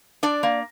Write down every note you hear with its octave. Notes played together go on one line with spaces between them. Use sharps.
D4 D5
A#3